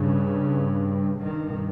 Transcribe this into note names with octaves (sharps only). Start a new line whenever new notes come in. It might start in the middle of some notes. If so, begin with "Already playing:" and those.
Already playing: G2 C#3
G2 D#3